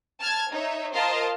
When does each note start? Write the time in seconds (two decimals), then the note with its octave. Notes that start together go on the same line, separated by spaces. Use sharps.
0.20 A5 F6 G#6
0.51 D#4 C#5 E5
0.94 F4 A#4 C5 D#5 F5 A5